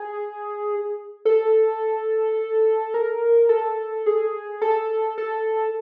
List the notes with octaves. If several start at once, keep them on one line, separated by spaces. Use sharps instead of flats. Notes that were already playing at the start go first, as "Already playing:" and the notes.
Already playing: G#4
A4
A#4
A4
G#4
A4
A4